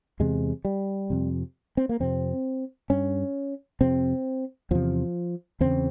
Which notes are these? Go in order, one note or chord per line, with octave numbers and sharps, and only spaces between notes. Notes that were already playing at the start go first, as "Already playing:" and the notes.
E2 C3 G#3
G3
F2 C3
C4
A#3
F2 C3 C4
G2 C#4
F2 C3 C4
E2 C3 F3
E2 C#3 C4